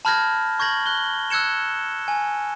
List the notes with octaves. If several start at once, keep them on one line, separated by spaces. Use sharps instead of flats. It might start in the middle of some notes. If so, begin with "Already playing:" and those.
A5 B5 F6 G6 G#6 A#6
C#6 G6 G#6 A#6 F#7
F#6 G7
E6 F#6 G#6 C#7 E7
G#5